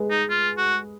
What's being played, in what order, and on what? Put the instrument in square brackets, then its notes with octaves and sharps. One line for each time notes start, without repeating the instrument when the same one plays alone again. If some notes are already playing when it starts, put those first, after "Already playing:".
Already playing: [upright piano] G#3 G#4 B4
[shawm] D#4
F4
F#4